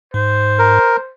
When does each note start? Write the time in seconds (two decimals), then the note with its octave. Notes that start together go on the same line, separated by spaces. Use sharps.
0.14 G#2 C5
0.59 A#4